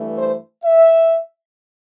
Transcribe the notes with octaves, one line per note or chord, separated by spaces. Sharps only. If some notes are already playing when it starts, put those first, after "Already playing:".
Already playing: G2 E3 A3
C5
E5